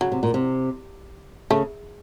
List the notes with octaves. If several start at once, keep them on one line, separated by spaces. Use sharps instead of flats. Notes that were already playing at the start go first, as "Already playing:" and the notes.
C#3 F#3
C3
A#2
C3
C#3 A3